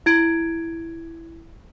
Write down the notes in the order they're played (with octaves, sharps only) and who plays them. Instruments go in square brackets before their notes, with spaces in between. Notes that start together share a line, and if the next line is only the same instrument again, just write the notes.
[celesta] E4 G#6 D7